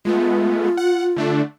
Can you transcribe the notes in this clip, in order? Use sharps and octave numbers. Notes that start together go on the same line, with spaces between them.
G#3 A3 B3 F4
F#5
D3 A3 D4